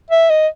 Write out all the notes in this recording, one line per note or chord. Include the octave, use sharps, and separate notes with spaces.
E5
D#5